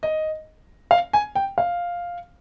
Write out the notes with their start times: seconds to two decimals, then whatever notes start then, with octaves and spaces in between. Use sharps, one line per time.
0.03 D#5
0.91 F5
1.13 G#5
1.35 G5
1.58 F5